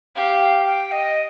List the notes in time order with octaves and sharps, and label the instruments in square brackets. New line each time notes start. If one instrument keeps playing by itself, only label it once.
[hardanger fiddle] G4 [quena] F5
[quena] G5
D#5